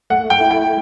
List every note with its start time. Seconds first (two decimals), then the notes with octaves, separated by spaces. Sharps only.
0.10 A3 F#5
0.30 G5
0.41 E4
0.51 G5